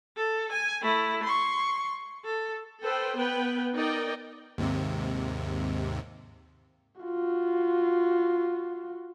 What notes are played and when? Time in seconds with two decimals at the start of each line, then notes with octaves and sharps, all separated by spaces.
0.17 A4
0.52 G#5
0.82 A3 E4
1.24 C6 C#6
2.25 A4
2.82 A4 B4 C5 G5
3.16 B3 B4 G5
3.74 D#4 A#4 D5 D#5 G5
4.58 D#2 G#2 C3
7.02 F4 F#4